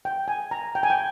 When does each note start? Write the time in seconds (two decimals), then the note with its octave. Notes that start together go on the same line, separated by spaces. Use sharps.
0.05 G5
0.28 G#5
0.51 A#5
0.75 G5
0.83 G#5
0.90 G5